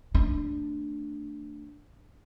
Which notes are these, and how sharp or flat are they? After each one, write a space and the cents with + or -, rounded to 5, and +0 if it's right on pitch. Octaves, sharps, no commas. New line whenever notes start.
A3 +25 D4 +0